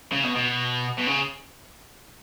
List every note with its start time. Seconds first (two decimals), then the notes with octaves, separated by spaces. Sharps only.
0.12 C#3
0.24 B2
0.36 B2
0.98 B2
1.07 C#3